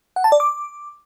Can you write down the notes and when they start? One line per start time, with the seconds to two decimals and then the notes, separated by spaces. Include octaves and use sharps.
0.16 F#5
0.24 A5
0.32 D5
0.40 D6